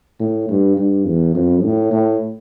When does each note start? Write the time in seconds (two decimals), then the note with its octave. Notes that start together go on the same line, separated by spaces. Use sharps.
0.20 A2
0.49 G2
0.77 G2
1.06 E2
1.35 F2
1.63 A2
1.92 A2